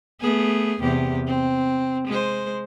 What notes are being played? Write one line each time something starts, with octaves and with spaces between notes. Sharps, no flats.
A3 B3 G#4
E2 C3 G4
C4
G#3 C5